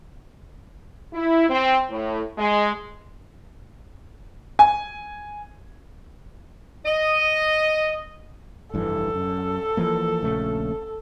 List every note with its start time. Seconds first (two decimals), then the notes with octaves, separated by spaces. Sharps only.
1.13 E4
1.49 C4
1.90 A2
2.38 G#3
4.59 G#5
6.85 D#5
8.74 F1 G2 E3 A4
9.15 F#2
9.77 E3 F3 A#3
10.23 A#1 C#3 A3